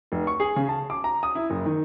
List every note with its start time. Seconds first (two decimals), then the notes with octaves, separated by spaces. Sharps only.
0.12 F1
0.27 C#6
0.40 G#4
0.56 C#3
0.69 A5
0.90 D6
1.04 A#5
1.23 D#6
1.35 E4
1.50 F#1
1.66 D#3